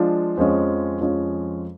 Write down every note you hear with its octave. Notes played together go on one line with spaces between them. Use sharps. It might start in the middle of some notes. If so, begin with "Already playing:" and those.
Already playing: F3 G#3 D4 F4
F2 F3 G#3 C#4
F2 F3 G#3 C#4